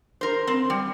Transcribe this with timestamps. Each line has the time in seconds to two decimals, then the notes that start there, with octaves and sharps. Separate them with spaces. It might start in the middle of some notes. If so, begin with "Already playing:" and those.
0.21 A#4 C5
0.47 C4
0.70 G3